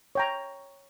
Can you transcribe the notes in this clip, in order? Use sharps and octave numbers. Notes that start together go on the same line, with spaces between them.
C#5 G5 A#5